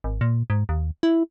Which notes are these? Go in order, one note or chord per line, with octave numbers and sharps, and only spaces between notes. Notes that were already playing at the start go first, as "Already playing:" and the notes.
G#1
A#2
G#2
D#2
E4